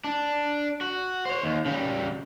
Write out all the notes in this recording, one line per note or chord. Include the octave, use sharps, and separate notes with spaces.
D4
F#4
C5 C#5
D#2
C#3 G3